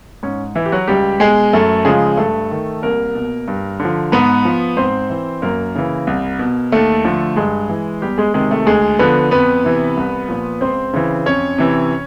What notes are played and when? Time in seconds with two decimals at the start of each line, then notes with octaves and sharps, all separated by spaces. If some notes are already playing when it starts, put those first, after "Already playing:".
0.23 G#2 C#4
0.55 E3 E4
0.66 G4
0.72 F#3 F#4
0.88 C#2 G3 G4
1.20 B2 G#3 G#4
1.53 F#2 A3 A4
1.85 C#3 F3 G#3 G#4
2.17 G2 A3 A4
2.51 D#3
2.82 C2 A#3 A#4
3.15 B2
3.48 G2
3.80 D3
3.85 F3
4.12 G#2 B3 B4
4.45 F3
4.77 G#2 C4 C5
5.10 E3
5.42 F#2 A#3 A#4
5.75 C#3 E3
6.07 C2
6.39 B2
6.72 D#2 A3 A4
7.05 D3 F3
7.36 G2 G#3 G#4
7.69 E3
8.01 E2 G3 G4
8.18 G#3 G#4
8.34 C3 D#3 G#3 G#4
8.51 A3 A4
8.66 D2 G#3 G#4
8.99 D3 F3 B3 B4
9.31 F2 B3 B4
9.64 C3 E3
9.97 C2
10.29 A#2 F3
10.61 C#2 C4 C5
10.93 C#3 E3
11.26 F2 C#4 C#5
11.58 C3 E3